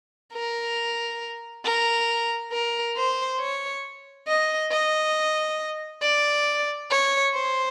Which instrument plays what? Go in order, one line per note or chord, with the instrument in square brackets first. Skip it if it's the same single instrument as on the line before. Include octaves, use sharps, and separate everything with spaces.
[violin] A#4
A#4
A#4
C5
C#5
D#5
D#5
D5
C#5
C5